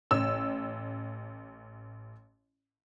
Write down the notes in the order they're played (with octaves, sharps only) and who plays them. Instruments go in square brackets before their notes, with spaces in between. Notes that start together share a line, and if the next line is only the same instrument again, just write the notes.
[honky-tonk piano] A1 E6